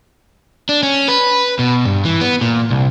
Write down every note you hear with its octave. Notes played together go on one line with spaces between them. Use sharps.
D4
C#4
B4
B2
G2
E3
B3
A#2
C2